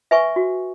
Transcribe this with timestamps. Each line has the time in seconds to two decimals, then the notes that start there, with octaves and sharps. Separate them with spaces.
0.11 B4 E5 G#5 C#6
0.36 F#4